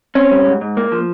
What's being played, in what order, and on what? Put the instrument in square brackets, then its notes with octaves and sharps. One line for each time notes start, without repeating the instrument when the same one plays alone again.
[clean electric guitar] C4 C#4
G3
G#2
G#2
A#3
F3